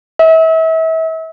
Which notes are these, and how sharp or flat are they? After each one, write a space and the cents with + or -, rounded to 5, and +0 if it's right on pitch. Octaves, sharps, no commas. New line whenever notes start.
E5 -35